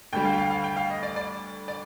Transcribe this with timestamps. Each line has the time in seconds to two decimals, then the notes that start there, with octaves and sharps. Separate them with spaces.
0.13 D2 D3 G3 G5
0.25 F5
0.33 G5
0.38 F5
0.51 F5
0.64 G5
0.76 F5
0.90 D#5
1.03 D5
1.16 D5
1.68 D5